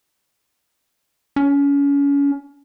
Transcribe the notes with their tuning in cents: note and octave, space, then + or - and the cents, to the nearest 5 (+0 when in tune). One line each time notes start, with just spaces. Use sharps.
C#4 +30